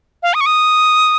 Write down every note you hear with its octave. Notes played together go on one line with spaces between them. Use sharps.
F5
D#6
C#6
D#6